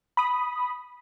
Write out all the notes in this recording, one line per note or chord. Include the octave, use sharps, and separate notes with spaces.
B5 D#6